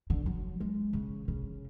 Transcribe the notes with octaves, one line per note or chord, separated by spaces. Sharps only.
D3
F#3
G#3
C#3
C#3